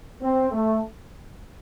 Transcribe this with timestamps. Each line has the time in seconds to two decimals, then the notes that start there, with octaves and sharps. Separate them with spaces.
0.22 C4
0.52 A3